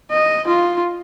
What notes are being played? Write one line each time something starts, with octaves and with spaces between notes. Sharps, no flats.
D#5
F4